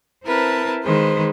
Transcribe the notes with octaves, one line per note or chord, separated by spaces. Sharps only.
C4 E4 A#4 B4 A5
D#3 G#3 B4 C5